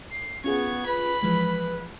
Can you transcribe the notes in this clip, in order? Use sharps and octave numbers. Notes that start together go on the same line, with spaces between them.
C7
B3 C#4 F4 G#4 C#6 G#6
B4 B5
E3 F3 G#3 B4